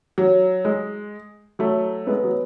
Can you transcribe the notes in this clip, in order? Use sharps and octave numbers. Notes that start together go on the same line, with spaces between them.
F#3
G#3
F#3 A3
G#3 B3
F#3